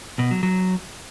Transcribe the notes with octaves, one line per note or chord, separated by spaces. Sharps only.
B2
F#3
F#3